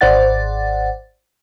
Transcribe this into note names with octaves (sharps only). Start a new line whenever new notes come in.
G#1 C5 D5 F#5 A6